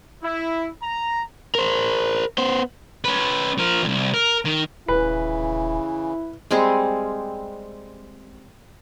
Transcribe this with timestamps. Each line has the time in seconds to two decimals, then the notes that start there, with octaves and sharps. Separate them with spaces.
0.23 E4
0.83 A#5
1.55 A#4 C5
2.38 B3 C5
3.05 C#4 B4
3.58 F3 A#4
3.83 C2 F2
4.14 A#4
4.45 D#3
4.88 D#1 C#3 E3 E4 B4
6.51 G3 G#3 C4 G#4